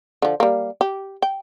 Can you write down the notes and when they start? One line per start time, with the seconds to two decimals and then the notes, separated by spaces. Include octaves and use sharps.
0.22 D3 F3
0.40 G3 A#3
0.81 G4
1.22 G5